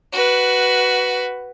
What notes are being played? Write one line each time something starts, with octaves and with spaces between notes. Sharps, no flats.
F#4 B4